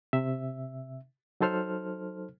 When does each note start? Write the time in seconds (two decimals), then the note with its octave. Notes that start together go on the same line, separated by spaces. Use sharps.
0.13 C3 E5
1.41 F#3 D#4 A4 C5 F6